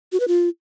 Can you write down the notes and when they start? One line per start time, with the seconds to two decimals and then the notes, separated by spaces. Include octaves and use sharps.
0.12 F#4
0.20 B4
0.28 F4